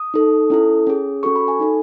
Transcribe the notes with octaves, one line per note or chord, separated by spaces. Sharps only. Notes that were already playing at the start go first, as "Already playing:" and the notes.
Already playing: D#6
D#4 A4
C#4 E4 A4
C#4 G#4
C#4 F#4 A4 C#6
B5
G#5
D#4 A4